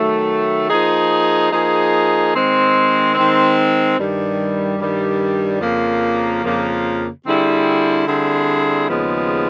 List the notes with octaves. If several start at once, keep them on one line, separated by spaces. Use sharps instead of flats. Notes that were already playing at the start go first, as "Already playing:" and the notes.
Already playing: D#3 F#3 A3
F3 A#3 D#4 G#4
F3 A#3 D#4 G#4
D#3 G#3 C4
D#3 G#3 C4
G2 D#3 G3
G2 D#3 G3
F2 C#3 F3 A#3
F2 C#3 F3 A#3
D3 G3 C4 E4 G#4
D3 G3 C4 E4 G#4
D#2 C#3 F3 G#3 B3